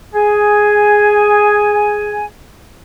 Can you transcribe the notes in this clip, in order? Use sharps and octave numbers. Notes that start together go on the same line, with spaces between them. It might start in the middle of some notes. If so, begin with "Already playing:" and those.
G#4 G#5